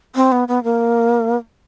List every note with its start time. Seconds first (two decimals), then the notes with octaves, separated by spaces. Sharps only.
0.15 C4
0.32 B3
0.48 B3
0.64 A#3